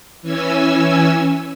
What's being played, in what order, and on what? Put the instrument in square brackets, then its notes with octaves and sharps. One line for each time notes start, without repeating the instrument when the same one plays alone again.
[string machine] E3 C#4 G#5 E6